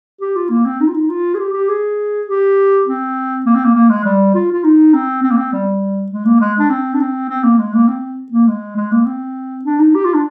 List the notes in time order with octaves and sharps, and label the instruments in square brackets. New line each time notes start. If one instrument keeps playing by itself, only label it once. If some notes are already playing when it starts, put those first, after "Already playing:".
[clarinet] G4
F4
A#3
C4
D#4
F4
D#4
F4
G#4
G4
G4
G#4
G4
C4
A#3
C4
A#3
A#3
G#3
G3
F4
F4
D#4
C4
C4
A#3
C4
G3
G#3
A#3
G#3
D4
C4
D4
C4
C4
A#3
G#3
A#3
C4
A#3
G#3
G#3
A#3
C4
D4
D#4
G4
F4
D4